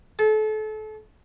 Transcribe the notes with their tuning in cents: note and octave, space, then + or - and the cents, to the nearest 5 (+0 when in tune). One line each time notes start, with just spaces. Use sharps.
A4 -35